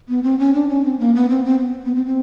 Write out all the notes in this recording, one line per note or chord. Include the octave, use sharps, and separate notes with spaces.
B3
C4
C#4
D4
C#4
C4
A#3
B3
C4
C4
B3
B3
C4
C4